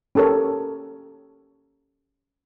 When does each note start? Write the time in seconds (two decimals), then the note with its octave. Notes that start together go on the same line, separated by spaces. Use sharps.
0.15 C#4 G4 A4 A#4 C#5